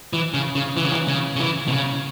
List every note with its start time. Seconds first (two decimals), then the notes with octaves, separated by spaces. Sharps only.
0.13 E3
0.34 C#3
0.55 C#3
0.77 E3
0.84 C#3
0.91 E3
1.08 C#3
1.36 C#3
1.40 E3
1.68 B2
1.72 C#3